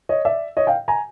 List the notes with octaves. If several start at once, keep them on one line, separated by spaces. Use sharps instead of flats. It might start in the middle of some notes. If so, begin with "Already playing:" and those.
C#5 D#5
D5 E5
C#5 D#5
F5 G5
G#5 A#5